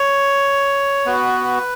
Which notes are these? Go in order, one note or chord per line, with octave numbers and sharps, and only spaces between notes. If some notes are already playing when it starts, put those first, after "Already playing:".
Already playing: C#5
B3 F#4 B4